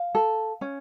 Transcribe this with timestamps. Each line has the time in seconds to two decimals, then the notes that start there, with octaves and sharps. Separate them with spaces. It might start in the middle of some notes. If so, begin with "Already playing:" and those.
Already playing: F5
0.15 A4
0.61 C#4